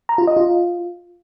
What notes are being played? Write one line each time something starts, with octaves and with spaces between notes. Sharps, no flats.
A#5
F4
D#5
F4